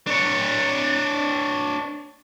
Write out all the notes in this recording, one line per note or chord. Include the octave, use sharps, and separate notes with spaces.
D4 C#5